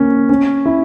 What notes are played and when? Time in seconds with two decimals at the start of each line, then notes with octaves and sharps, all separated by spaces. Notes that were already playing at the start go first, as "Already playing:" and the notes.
Already playing: A#3 C#4
0.29 C#4
0.66 E4